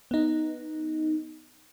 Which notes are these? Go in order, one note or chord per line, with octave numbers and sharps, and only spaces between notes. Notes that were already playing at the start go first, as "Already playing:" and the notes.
B3 D#4